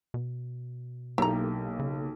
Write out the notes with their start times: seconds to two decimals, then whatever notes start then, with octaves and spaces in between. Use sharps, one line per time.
0.14 B2
1.18 B1 A#3 E4 G4 A4 A#5
1.79 C#3